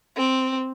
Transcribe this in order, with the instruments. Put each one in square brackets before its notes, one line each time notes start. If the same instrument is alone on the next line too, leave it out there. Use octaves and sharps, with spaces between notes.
[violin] C4